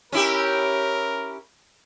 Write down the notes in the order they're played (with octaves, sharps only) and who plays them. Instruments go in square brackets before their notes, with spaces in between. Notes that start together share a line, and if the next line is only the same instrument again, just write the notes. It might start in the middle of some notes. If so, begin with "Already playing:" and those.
[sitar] C#4 E4 G4 [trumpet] A#4